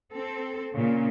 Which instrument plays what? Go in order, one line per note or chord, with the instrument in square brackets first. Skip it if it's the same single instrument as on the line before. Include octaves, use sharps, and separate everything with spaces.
[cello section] C4 A4
A#2 C#3